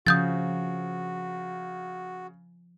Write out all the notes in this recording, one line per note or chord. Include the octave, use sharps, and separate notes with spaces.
C#3 F3 F#4 D#6 G6 A6